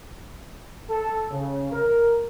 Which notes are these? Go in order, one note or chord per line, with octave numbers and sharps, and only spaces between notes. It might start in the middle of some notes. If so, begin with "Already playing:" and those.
A4
C#3
A#4